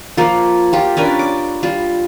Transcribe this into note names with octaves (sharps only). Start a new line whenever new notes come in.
F3 A#3 F4
F4 G4
C#4 D4 A#4 B4
D6
G3 F4